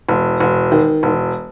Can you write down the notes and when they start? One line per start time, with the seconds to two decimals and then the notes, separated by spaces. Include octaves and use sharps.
0.09 E1
0.40 E1
0.72 D#3
1.03 E1